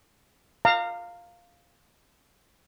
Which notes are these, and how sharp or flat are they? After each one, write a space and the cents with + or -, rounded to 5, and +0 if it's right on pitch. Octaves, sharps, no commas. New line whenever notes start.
F5 +0 A#5 -30